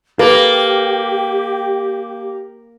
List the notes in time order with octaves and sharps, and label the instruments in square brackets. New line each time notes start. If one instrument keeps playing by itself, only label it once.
[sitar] A#3 [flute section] G4 [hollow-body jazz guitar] A4 B4